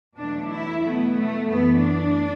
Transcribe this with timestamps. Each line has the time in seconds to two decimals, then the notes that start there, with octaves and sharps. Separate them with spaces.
0.18 E2 B2 F#3 A3 D4
0.51 E4
0.83 B2 F#3 A3 B3
1.16 A3
1.48 F#2 E3 A3 B3
1.81 D4